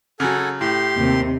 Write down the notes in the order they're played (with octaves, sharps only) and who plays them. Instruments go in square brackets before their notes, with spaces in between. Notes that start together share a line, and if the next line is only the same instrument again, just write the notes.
[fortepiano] C#3 F#3 [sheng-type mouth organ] A4 F#5 G#5
[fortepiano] A2 [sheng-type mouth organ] G4 C6
[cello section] D#2 C3